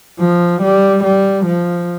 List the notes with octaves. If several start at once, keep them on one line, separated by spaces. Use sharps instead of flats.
F3
G3
G3
F3